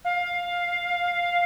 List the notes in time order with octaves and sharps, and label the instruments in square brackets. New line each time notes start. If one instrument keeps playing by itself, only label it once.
[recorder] F5